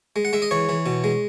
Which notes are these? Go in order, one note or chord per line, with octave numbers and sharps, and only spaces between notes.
G#3
F#5
G#3 E5
D#5
E3 C#5
E3
B2
G#3